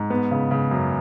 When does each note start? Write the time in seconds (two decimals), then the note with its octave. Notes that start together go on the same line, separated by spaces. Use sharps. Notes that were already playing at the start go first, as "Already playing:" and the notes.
Already playing: G#2
0.10 B3
0.31 C#3
0.51 C#3
0.71 F#2